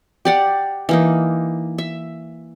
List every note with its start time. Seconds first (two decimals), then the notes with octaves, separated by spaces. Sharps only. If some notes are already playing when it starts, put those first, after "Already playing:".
0.25 G4 D5 F#5
0.89 E3 A#3 D#4
1.78 E5